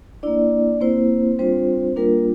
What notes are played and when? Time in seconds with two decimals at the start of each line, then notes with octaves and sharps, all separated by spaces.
0.23 A#3 D4 E4 D5
0.81 A#3 C4 E4 C5
1.39 G3 C4 D4 F4 C5
1.96 G3 A#3 D4 F4 A#4